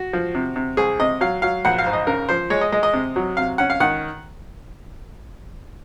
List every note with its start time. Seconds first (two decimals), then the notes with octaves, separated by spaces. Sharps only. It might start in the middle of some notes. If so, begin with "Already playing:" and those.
Already playing: F#4
0.13 F3
0.35 C3
0.56 C3
0.77 C2 G#4
1.00 C3 D#5
1.21 F#3 F5
1.42 F#3 F5
1.65 A#1 F#5
1.78 F5
1.87 G#2
1.93 D#5
2.07 C#3 A#4
2.29 F3 C5
2.50 G#3 C#5
2.61 D#5
2.72 G#3 D#5
2.83 D#5
2.93 C3
3.16 F#3
3.37 C3 F5
3.58 C#4 F#5
3.70 F5
3.80 D#3 F#5